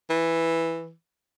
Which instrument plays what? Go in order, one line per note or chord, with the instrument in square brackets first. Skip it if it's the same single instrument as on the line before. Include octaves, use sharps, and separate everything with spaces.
[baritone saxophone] E3